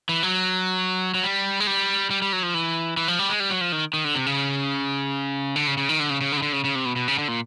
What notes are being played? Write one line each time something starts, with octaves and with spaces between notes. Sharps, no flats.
E3
F#3
F#3
G3
G#3
G3
G3
G3
F#3
F3
E3
E3
F3
G3
G#3
G3
F#3
F3
D#3
D#3
D3
C3
C#3
D3
C#3
C#3
D#3
D3
C#3
C#3
D3
C#3
D3
C#3
C#3
C3
B2
B2
C#3
D3
A#2